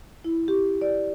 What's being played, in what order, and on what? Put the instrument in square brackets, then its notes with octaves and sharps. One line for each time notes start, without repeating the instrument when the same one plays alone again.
[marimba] E4
G4
D5